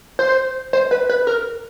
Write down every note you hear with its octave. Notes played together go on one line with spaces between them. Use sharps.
C5
C5
B4
B4
A#4